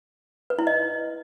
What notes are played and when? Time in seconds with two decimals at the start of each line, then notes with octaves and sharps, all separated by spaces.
0.50 B4
0.59 E4
0.67 D#5